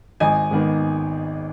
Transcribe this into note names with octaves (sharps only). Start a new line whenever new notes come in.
G#1 D#5 G#5
G#2 D#3 B3